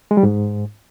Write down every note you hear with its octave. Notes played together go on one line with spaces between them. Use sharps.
G#3
G3
G#2